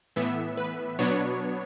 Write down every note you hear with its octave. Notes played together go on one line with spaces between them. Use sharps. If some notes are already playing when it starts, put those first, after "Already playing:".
A2 E3 B3 E5
B4
B2 F#3 B3 D4 C#5